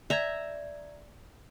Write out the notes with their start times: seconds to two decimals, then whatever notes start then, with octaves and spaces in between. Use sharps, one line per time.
0.10 D5 E5 A#5 G#6